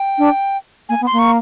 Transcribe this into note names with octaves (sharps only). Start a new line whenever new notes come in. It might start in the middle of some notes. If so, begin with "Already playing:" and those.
Already playing: G5
D4
A#3 G#5
B3
C6
A#3
C#6